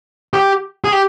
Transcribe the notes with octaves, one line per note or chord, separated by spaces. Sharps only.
G4
G#4
G4